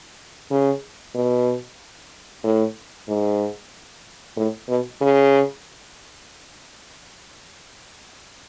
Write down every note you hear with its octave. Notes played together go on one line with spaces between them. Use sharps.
C#3
B2
A2
G#2
A2
B2
C#3